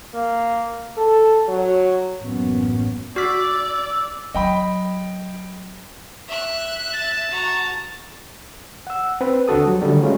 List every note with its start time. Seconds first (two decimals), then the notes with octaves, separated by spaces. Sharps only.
0.14 A#3
0.97 A4
1.48 F#3
2.19 A1 F#2 F#3 A#3 B3 C#4
3.16 F#4 D5 E6 F6 B6
4.34 F#3 D#5 G5 B5
6.28 E5 F#6
6.93 A5
7.30 F#4 A#5
8.87 F#5 E6
9.21 C4 B4
9.48 D2 D4 F#4 A4 D#6
9.66 F#3 G3
9.82 D3 D#3 F#3 G3 A3 A4
10.02 F#3 G#3 A3 C#4 F4